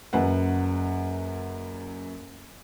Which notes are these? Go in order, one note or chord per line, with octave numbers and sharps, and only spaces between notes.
F#1 F#2 B4 F#5